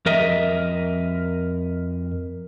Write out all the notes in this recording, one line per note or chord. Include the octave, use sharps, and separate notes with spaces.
F2 A#4 D#5 E5